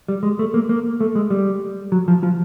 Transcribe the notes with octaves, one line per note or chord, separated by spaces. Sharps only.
G3
G#3
A3
A#3
A#3
A3
G#3
G3
F#3
F3
F3